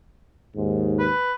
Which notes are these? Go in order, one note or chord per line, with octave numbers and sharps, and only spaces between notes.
D#2 G#2
B4